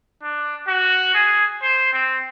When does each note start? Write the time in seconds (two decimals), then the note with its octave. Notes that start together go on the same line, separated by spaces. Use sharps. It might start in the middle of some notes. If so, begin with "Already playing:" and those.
0.23 D4
0.68 F#4
1.15 G#4
1.62 C5
1.93 C4